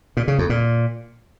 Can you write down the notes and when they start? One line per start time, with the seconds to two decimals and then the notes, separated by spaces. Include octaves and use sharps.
0.17 A#2
0.28 C#3
0.39 F2
0.50 A#2